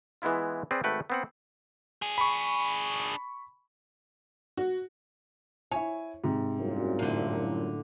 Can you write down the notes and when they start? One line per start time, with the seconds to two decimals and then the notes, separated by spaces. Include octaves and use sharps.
0.22 E3 G#3 B3 E4 F4
0.71 C4 G#4 B4 D5
0.84 G#1 A3 B4 F#5 G5
1.10 B3 C4 F#5
2.02 D4 G#4
2.18 B5 C#6
4.57 F#4
5.71 E4 C#5 G#5
6.24 G#2 C3
6.59 C2 F#2 A#2
6.99 A2 D3